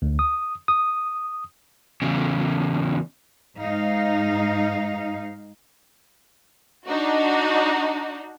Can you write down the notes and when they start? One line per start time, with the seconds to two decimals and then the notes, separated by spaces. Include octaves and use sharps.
0.02 D2
0.19 D#6
0.68 D#6
2.02 E2 C#3
3.57 G#2 D#4 F5
6.86 D4 D#4 F#4